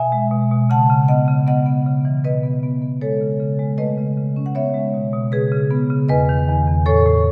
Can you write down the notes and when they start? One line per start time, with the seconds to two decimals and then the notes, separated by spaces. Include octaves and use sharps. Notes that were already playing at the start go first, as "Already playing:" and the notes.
Already playing: B2 E5 G#5
0.12 G#3
0.31 B2
0.51 B2
0.70 C#3 F#5 A5
0.90 C#3
1.08 B3 D#5 F#5
1.28 C#3
1.47 B3 D#5 F#5
1.66 B3
1.86 C#3
2.05 E3
2.24 B2 B4 D#5
2.43 B3
2.63 B3
2.82 B3
3.01 G#3 A4 C#5
3.21 C#3
3.40 C#3
3.59 G#3
3.78 A3 B4 D#5
3.98 C#3
4.17 C#3
4.36 C#4
4.46 F#5
4.55 B3 C#5 E5
4.74 G#3
4.94 B2
5.13 B2
5.32 C#3 G#4 B4
5.52 C#3
5.71 B3
5.90 C#3
6.09 E2 B4 D#5
6.29 D#3
6.48 E2
6.67 E2
6.86 A2 A4 C#5
7.06 A2